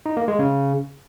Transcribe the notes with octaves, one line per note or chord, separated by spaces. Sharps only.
D#4
A#3
G#3
C#3